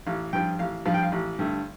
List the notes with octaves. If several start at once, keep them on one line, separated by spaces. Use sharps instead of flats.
A1 F5
G2 F3 G5
A1 F5
G2 F3 F5
G5
F5
A1
G2 D3 A3